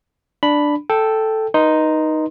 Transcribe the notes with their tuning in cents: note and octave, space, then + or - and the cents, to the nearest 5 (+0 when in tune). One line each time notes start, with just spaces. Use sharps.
D4 +0 B5 +0
A4 +0 G5 +0
D#4 +0 B4 -35 C6 +0